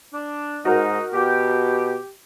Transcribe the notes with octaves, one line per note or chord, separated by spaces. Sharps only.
D4
G#2 D#4 F#4 A#4
B2 G4